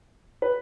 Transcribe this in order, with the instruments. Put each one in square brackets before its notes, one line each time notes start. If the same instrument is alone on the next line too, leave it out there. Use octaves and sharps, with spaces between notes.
[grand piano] B4